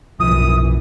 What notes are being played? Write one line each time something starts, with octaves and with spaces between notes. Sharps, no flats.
B1 F#2 E3 F3 D#6